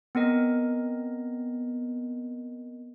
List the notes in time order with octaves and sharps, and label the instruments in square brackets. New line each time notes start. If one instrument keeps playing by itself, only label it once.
[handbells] B3 C4 A#4 D#5